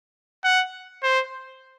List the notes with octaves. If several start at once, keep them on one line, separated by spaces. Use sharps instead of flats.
F#5
C5